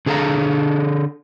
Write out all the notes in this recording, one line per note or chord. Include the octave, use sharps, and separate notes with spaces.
D3 G#4 A4 C#5 F5 A#5